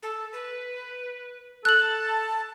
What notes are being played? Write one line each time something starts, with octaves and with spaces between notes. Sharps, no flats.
A4
B4
A4 A5 F#6 F#7